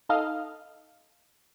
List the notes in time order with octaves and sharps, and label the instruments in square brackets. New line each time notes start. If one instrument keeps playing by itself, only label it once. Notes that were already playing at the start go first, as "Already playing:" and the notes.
[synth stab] D#4 A4 D#5 F5